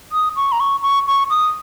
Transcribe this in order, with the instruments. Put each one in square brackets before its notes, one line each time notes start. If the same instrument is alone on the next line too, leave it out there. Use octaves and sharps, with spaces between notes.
[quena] D#6
C#6
A#5
C#6
C#6
C#6
D#6